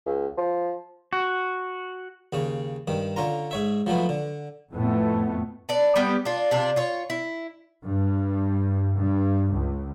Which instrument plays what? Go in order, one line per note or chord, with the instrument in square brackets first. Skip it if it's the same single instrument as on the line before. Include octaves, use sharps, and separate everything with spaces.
[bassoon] C#2
F3
[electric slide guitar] F#4
[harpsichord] D#2 C#3 C#4
G2 D#3
D3 C#4 F4 A#5
G#2 C#5 E5
F3 F#3 A3 B3
D3
[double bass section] F2 A2 A3 B3
[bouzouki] A4 B4 D5
G3 B3 G4
D4 F4
C3 D4 F4
F4 C#5
E4
[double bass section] G2
G2
C#2